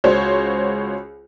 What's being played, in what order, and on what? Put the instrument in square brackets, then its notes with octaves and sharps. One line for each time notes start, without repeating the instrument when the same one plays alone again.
[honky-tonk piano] C#2 F#4 C5 C#5